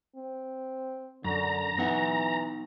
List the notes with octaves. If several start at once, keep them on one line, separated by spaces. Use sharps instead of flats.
C4
F#2 D3 A#5
E3 B3 D#4 F#5